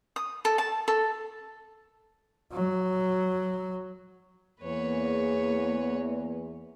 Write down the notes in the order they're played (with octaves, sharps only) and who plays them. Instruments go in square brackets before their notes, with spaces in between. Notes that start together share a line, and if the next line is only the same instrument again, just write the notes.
[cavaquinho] D#6
A4
A5
A4
[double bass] F#3
[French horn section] E2 [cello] A#3 [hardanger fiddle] B4 C#5